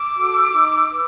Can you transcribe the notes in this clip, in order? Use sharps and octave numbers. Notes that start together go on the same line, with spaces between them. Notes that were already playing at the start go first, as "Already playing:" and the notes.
Already playing: D6 E6
F#4 A4
D#4
B4